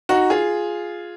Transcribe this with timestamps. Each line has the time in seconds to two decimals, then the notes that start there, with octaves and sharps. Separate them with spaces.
0.09 D#4 F#4
0.30 F4 G#4